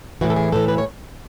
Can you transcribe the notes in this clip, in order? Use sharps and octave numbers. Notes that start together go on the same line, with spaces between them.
A2 E3 F#4
A4
G#4
A2 E3 A4
B4
C#5